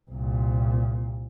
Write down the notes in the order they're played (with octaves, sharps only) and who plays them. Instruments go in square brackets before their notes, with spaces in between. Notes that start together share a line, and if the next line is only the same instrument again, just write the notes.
[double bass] C2 A#2